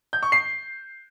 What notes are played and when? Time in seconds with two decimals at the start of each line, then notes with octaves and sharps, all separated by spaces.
0.13 G6
0.23 C#6
0.32 C7